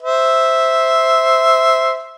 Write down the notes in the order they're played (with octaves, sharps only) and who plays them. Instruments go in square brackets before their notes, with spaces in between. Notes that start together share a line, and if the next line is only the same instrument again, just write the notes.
[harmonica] C5 E5